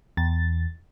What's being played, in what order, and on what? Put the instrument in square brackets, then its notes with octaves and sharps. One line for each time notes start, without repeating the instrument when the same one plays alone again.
[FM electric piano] E2 A6